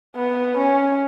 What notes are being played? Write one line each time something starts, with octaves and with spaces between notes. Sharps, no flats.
B3
C#4